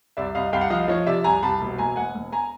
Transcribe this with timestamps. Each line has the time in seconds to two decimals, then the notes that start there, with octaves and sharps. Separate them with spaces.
0.17 C2 D5 E5
0.35 C2 D#5 F5
0.53 C2 F5 G5
0.61 F#5
0.70 F3 D#5 F5
0.88 F3 C#5 D#5
1.06 C3 D5 E5
1.24 C2 G#5 A#5
1.42 C2 A5 B5
1.61 E1
1.78 E1 G#5 A#5
1.96 E1 F#5 G#5
2.15 E1
2.32 G#5 A#5